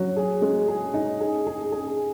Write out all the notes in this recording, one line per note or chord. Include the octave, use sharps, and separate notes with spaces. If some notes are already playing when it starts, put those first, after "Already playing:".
Already playing: F#3
G#4
G#3
G#4
D#4
G#4
G#4
G#4